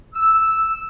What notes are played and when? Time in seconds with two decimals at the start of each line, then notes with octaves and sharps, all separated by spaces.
0.15 E6